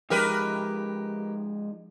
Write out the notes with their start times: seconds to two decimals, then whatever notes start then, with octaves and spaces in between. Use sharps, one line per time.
0.10 F3 G#3 D#4 G4 A#4 B4